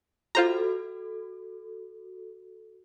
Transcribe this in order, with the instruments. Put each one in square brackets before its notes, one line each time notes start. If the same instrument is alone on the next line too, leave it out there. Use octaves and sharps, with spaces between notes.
[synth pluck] F4 C5 A#5 [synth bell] F#4 A4